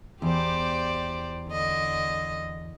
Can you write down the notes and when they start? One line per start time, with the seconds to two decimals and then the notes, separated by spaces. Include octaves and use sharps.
0.22 E2 G4 C5 D5
1.49 D3 D#5